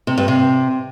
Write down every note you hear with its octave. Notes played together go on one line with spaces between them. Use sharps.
C3
G2
C3